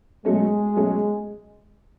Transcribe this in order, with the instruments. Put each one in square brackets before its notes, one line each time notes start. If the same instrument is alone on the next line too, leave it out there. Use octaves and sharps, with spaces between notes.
[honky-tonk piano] B2 F#3 A3 C#4 [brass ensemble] G#3
[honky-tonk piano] B2 F#3 A3 C#4